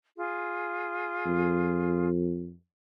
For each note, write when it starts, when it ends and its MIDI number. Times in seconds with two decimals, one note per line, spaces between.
0.16 2.08 65
0.16 2.08 68
1.26 2.52 41